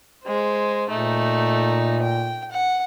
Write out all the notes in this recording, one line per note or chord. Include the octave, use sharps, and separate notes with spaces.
G#3 C5
A#2 A3 D#4
G5
F#5